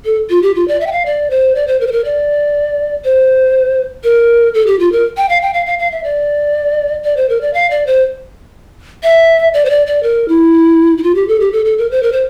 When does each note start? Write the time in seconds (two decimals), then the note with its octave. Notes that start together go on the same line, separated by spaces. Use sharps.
0.05 A4
0.30 F4
0.43 G4
0.55 F4
0.68 D5
0.80 E5
0.87 G5
0.92 F5
1.06 D5
1.30 C5
1.55 D5
1.67 C5
1.81 A#4
1.87 C5
1.92 A#4
2.05 D5
3.05 C5
4.04 A#4
4.54 A4
4.67 G4
4.80 F4
4.92 A#4
5.17 G5
5.29 F5
5.42 G5
5.54 F5
5.66 F5
5.79 F5
5.92 E5
6.04 D5
7.04 D5
7.17 C5
7.29 A#4
7.41 D5
7.54 F5
7.71 D5
7.87 C5
9.03 E5
9.54 D5
9.65 C5
9.70 D5
9.87 D5
10.03 A#4
10.28 E4
10.98 E4
11.03 F4
11.15 G4
11.28 A4
11.40 G4
11.53 A4
11.65 A4
11.78 A#4
11.91 C5
12.03 A#4
12.12 C5